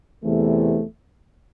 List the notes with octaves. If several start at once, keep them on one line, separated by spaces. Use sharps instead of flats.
E2 C3 E3 A3